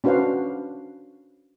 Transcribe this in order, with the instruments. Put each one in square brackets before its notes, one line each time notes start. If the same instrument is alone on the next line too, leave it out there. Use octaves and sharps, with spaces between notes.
[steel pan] C#4 D4 F#4 B4 C5 F5